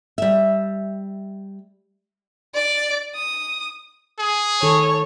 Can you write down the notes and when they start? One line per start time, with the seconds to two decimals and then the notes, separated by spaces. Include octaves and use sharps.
0.18 G3 E5
2.54 D5
3.15 D#6
4.19 G#4
4.63 D#3 A4 C#5